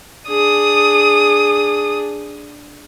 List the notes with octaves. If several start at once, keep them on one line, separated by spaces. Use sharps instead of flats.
D4 G#4 D#6